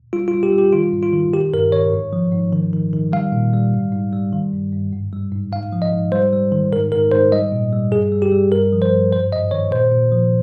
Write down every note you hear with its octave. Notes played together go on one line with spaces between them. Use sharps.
G3 F4
F4
G3
G4
G3
G4
D#3 F4
G#2
F4
D#3
D#3 G4
G2 A#4
D#3 C#5
G#2
F3
G#2
D#3
D#3
D#3
G3 F5
A#2
G3
G#2
G#2
G3
D#3
G2
G2
G#2
G3
G#2
G#2 F5
F3
D#5
G#2
G3 C5
G3
D#3
G#2 A#4
G#2 A#4
G#2 C5
G3 D#5
A#2
G3
G2 G#4
G3
G4
G3
G2 A#4
F3
C5
G2
G#2 C5
G#2 D#5
D#3 C#5
A#2 C5
A#2
F3